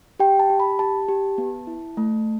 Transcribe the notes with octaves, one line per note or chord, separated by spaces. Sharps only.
G4 G5
A5
G4
B5
G4 A5
G4
B3
E4
A3